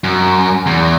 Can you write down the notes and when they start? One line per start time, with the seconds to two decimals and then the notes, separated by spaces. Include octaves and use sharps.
0.04 F#2
0.66 E2